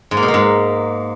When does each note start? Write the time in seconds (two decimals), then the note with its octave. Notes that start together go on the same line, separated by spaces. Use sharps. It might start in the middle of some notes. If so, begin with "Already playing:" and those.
0.11 G#2
0.17 A#3
0.23 B2
0.28 A#3
0.34 G#2